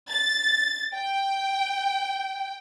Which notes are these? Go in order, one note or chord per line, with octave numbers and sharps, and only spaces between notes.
A6
G5